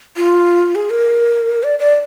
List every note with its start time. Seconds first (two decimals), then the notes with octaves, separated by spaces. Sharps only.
0.17 F4
0.75 G#4
0.90 A#4
1.63 D5
1.79 D5